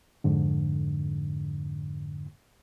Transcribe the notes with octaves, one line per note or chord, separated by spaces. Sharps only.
F2 G#2 D3